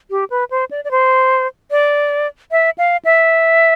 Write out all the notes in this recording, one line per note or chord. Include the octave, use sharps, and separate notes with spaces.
G4
B4
C5
D5
D5
C5
D5
E5
F5
E5